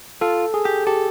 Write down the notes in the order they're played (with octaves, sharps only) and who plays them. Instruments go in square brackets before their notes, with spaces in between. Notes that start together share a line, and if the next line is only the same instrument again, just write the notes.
[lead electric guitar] F4 [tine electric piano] A4
[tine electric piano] G#4
[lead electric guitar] G4
[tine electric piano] G4 [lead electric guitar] A4